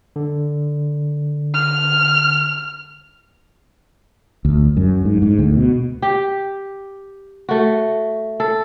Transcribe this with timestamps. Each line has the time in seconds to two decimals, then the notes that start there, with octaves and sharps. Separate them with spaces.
0.16 D3
1.53 F6
4.45 D2
4.77 F#2
5.05 G#2
5.22 G#2
5.39 D2
5.57 B2
6.02 G4
7.49 A3 F#4
8.40 A4